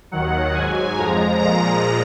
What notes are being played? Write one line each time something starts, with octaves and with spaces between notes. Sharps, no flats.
D#2 D#3 F#3 F#5
G#2 F#3 G#5
F2 F3 G#3 A#5
A#2 F3 G#3 A#5